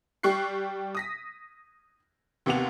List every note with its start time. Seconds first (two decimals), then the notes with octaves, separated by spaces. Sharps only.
0.23 G3 G4 C#6 F#6 C7
0.95 D#6 A#6 B6
2.46 D#2 C3 B3 F#5 F7